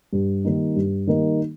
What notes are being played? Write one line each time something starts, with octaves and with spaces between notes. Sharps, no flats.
G2
D#3 G3 A#3 D#4
G2
D#3 G3 A#3 D#4